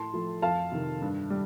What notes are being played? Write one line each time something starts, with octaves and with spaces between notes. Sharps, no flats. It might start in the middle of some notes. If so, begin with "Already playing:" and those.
Already playing: A2 A5 C6
F3 A3
F2 F5 A5
C3 D#3
G2
G3